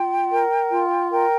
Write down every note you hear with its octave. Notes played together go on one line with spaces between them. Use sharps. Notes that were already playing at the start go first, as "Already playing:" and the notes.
Already playing: F4 G5
A#4
F4
A#4 G5